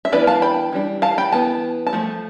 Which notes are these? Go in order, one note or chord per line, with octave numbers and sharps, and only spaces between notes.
E5
E3 B3 D4 B4 D5
F5 A5
G5 B5
E3 G3 D4
F5 A5
G5 B5
E3 B3 A5
A5
F3 A3